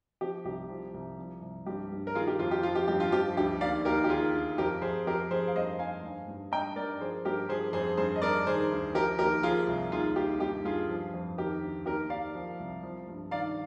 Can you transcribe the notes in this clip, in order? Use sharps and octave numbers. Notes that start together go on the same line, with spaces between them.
F3 G4
C2 G4
F3
C2
F3
C2
G2 G4
G2
A#4
D#3 F4 G#4
G4
F2 F4
G4
F3 F4
G4
G2 G4
F4
F3 G4
D2 G4
D#2 D5 F5
D#2 G4 A#4
G4
D#3 F4 G#4
D2
F2 G4 A#4
F2 G#4 C5
F3 G4 A#4
F2 G#4 C5
F5
G2 C5 D#5
G2 F5 G#5
G2
G2
G2 D#5 G5
G2 A#4 D5
F3 G#4 C5
G2 G4 A#4
F3 G#4 C5
F2 G#4 C5
G2 G#4 C5
D#5
G2 A#4 D5
D#3 G#4 C5
D2
F3 G4 A#4
D#2 G4 A#4
F3 F4 G#4
C2
D#2 F4 G#4
D#2 G4
G2 G4
G2 F4 G#4
F3
F2
D#3 G4 A#4
D2
D#2 G4 A#4
D#2 D5 F5
F3
C2
F3
G2
D#3 D5 F5